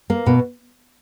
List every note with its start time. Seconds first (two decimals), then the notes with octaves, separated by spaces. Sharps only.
0.10 A#3
0.26 B2